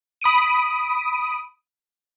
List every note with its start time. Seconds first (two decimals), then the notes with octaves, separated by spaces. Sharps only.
0.21 B5 D#6 D7 D#7